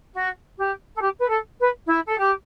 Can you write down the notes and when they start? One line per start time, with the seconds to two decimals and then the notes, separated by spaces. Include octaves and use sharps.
0.14 F#4
0.58 G4
0.95 A4
1.01 G4
1.19 B4
1.29 A4
1.59 B4
1.87 E4
2.07 A4
2.18 G4